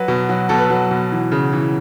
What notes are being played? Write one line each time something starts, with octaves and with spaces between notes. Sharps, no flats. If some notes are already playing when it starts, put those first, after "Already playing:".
Already playing: F#3 B4
B2
F#3
B2 A4
B4
F#3 A4
B2
E3
C#3
E3